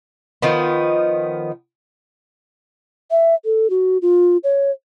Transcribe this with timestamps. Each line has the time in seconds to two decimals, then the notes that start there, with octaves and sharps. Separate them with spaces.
0.42 D#3 F3 B3
3.11 E5
3.45 A4
3.70 F#4
4.02 F4
4.44 C#5